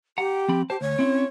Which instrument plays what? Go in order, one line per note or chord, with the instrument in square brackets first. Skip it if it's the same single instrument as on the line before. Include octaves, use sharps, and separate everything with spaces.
[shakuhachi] G4 [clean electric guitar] F#5 A#5
[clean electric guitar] F3 C4 B5
[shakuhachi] G4 [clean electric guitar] C5 A5
[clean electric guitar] D2 [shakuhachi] C#5
[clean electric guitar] C4 C#4 E4